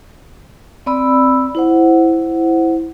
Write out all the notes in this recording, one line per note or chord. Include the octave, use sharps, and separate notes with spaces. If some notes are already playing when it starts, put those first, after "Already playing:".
C4 D5 B5 E6
E4 C5 F#5